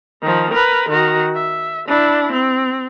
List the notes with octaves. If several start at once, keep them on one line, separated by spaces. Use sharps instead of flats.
D#3 F3
A#4 B4
D#3 F#4
E5
D4 E4
C4